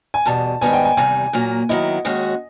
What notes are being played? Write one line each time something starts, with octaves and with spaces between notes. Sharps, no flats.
G#5
E2 B2 G3 A5
G#2 D#3 G3 B3 D4 G#5
G5
G#5
E2 C3 D#3 G3 G#5
A#2 F#3 A#3
D#3 F#3 B3 E4 D#5
D#2 D#3 G#3 C#4 F#4